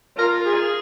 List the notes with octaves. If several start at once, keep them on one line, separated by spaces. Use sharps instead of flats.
F4 A#4
G#4